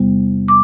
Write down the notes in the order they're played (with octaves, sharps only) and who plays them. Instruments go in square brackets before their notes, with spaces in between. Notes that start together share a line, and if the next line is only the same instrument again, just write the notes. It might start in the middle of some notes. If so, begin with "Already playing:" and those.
Already playing: [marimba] E2 C3 G3 B3
D6